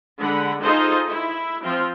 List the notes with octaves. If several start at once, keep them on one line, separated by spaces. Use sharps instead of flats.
D3 G#3 F#5 B5
D#4 F4 G#4 A4 C5 D#5
E4
F3 C4 F4